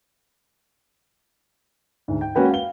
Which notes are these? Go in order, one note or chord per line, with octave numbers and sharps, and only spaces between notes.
D2 G#2
G5
G#3 A#3 C#4 F#4 B4 G5
F5 G7